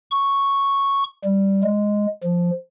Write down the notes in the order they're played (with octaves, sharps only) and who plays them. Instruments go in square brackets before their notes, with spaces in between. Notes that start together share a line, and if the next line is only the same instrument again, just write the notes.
[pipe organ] C#6
G3
G#3
F3